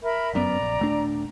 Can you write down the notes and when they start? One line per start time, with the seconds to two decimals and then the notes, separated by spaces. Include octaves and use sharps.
0.03 A#4 E5 B5
0.33 G1 F#2 B3 D5 A#5
0.60 A#1
0.79 D#1 A3 D4